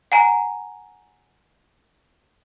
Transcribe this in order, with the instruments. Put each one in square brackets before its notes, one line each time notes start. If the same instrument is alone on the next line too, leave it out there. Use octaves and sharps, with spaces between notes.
[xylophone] F#5 G#5 A#5